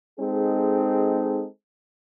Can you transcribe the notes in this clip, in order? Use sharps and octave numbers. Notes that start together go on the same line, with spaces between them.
G#3 C4 D#4 G#4 A4